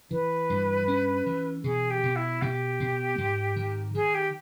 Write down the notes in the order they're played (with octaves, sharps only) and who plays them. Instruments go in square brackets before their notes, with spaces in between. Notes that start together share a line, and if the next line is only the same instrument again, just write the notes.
[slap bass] E3 [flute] B4
[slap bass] G2
C#4
E3
[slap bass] B2 [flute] G#4
[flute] G4
[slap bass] B2
[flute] E4
[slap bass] B2 [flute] G4
[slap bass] B2
G#2
D#3
[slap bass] D#3 [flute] G#4
[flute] G4